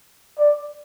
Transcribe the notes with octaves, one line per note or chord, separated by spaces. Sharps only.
D5